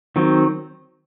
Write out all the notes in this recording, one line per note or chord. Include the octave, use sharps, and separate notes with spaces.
D#3 F#3 C4